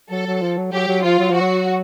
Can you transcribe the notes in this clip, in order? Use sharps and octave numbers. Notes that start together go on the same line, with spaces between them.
F#3 A4
F#3
F3
F#3
F#3 G4
F#3
F3 F4
F#3
F3 F#4
F#3